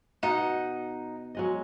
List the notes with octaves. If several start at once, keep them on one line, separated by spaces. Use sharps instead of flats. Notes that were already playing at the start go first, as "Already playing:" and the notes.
B2 D#4 F#5
F#3 G#3 D#5